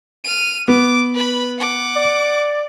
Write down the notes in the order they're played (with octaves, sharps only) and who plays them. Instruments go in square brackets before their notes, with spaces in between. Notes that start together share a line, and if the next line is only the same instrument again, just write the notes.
[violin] F6 D#7
[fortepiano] B3 [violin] D6
[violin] B4 B5
F#5 D6
[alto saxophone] D5